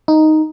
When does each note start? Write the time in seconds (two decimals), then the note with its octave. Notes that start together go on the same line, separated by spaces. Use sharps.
0.08 D#4